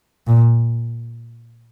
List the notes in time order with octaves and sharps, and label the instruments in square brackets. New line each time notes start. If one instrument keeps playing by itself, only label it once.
[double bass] A#2